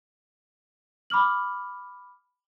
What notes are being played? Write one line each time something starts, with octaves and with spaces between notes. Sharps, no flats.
B5 D6 F6 F#7